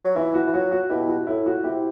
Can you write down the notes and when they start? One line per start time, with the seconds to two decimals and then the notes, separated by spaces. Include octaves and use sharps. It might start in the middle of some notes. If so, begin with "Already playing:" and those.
0.05 F#3
0.15 E3 E4
0.34 F#4
0.47 E3
0.54 F#3 F#4
0.72 F#4
0.89 B2 E4 G4
1.08 F#4
1.27 A2 E4
1.46 F#4
1.63 C3 E4 G4